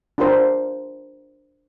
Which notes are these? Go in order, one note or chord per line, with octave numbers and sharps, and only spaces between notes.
D4 F4 G4 A#4 C5